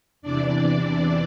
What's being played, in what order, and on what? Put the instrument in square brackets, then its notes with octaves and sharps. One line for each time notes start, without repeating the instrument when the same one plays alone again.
[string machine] E2 C3 E3 D4 D5